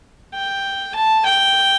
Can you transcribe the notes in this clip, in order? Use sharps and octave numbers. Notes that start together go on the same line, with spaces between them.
G5
A5
G5